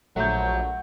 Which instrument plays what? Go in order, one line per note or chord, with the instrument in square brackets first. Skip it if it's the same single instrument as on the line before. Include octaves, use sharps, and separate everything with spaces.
[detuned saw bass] A#1 [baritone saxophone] F#3 [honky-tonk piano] A3 G6 [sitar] F#4